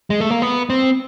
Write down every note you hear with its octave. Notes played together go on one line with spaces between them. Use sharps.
G#3
A3
A#3
B3
C4